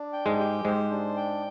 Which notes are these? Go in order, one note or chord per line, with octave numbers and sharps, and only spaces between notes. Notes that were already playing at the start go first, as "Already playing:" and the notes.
Already playing: D4
G5
G#2 G#3
G4
G#2 G#3 C5
D4
G5